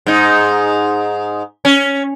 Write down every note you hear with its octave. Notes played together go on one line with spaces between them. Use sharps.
G#2 D#4
C#4